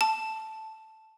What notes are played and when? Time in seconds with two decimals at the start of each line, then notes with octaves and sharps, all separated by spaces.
0.01 A5